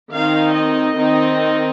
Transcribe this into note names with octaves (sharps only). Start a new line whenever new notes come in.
D#3 C4 D#4 F5
D#5
D#3 C4 D#4